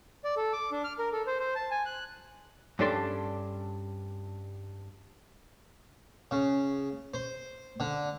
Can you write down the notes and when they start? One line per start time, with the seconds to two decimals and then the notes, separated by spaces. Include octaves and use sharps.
0.24 D5
0.37 A4
0.53 D6
0.72 D4
0.84 F6
0.99 A#4
1.13 A4
1.27 C5
1.40 C5
1.55 A5
1.71 G#5
1.86 F#6
2.79 G2 C#4 D4 A4 D5 C6
6.31 C#3
7.14 C5
7.80 D3